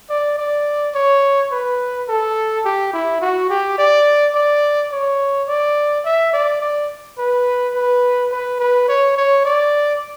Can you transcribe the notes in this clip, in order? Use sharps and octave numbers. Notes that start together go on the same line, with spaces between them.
D5
D5
C#5
B4
A4
G4
E4
F#4
G4
D5
D5
C#5
D5
E5
D5
D5
B4
B4
B4
B4
C#5
C#5
D5